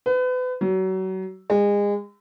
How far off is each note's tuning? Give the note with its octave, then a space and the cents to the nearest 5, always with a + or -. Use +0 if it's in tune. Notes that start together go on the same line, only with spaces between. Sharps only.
B4 +35
F#3 +30
G#3 -30